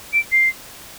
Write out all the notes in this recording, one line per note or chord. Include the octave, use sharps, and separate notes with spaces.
D7
C7